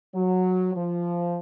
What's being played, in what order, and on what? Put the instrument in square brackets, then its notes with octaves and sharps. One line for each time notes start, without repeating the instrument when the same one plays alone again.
[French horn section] F#3
F3